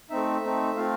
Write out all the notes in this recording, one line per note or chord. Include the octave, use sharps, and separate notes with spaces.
A3 C4 D#4 E5
A3 C4 D#4
A3 C4 F4 F5